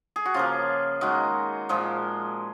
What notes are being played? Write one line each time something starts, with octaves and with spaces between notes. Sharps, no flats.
G#4
F#4
C#3 F3 A#3 F4
D#3 G#3 F#4
A#2 F3 G#3